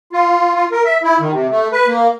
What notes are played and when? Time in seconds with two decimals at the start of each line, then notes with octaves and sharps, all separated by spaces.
0.13 F4
0.55 F4
0.71 A#4
0.85 E5
1.03 E4
1.20 D#3
1.32 C3
1.50 A3
1.72 B4
1.87 A#3